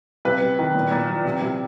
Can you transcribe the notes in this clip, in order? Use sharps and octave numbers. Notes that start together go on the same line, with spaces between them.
C3 B4
C3
D#3
A#2
A#2
F3
C3
C3